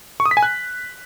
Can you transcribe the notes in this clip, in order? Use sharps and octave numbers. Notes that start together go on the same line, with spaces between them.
C#6
D#6
B6
G#5
F#6